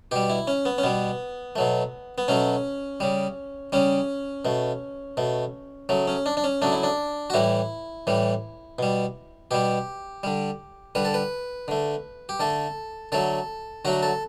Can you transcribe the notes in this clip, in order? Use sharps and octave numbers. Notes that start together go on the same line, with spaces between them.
B2 G3 G4
E4
C#4
B3
C#4
B2 G3 B3
B2 F#3 A3
B3
B2 F#3 A3 C#4
C#3 G3
C#3 G3 C#4
B2 A3
B2 A3
C#3 F#3 A3
C#4
D4
D4
C#4
C#3 F#3 A3 D4
E4
D4
F#4
A2 E3 G3 E4
A2 E3 G3
B2 G3
B2 G3 G4
D3 G3
D3 G3 B4
A4
B4
D3 A3
G4
D3 A3 A4
D3 F#3 A3 A4
D3 F#3 A3 F#4
A4